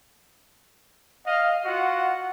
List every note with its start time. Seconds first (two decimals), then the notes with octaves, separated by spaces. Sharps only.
1.25 D#5 F5
1.65 F4 F#4 F#5